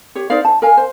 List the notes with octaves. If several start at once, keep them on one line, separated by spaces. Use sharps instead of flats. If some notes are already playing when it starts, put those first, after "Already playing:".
G4 C#5
D#4 C5 D5 F5
A5
A#4 F5 G#5
C5